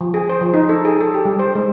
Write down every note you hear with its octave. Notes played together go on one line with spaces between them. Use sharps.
F3
G#4
C5
F3
D#4
A4
G#4
A4
G4
G3
C5
G#3